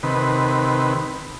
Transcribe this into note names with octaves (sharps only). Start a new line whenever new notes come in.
C3 D#3 B4